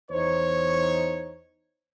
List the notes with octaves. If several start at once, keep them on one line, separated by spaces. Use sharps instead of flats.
E2 D#4 C5 C#5